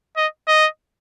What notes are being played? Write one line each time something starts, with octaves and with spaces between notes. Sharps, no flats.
D#5
D#5